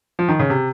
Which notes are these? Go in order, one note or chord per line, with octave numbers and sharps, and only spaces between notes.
F3
D#3
C#3
C3